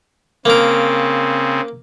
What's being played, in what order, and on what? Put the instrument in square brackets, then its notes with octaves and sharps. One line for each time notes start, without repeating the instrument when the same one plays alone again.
[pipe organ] C#3 C4 [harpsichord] A#3 A#4